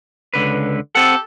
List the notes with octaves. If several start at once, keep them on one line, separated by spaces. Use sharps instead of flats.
C#2 D3 B4
C4 G4 A4 F#5